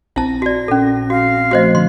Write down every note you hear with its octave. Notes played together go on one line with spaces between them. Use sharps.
A#1 C4 E4 A5 A#6
F#4 D5
A#2 C#4 A4
F#4 F5
F3 A3 F#4 C5 D#5
D3 C6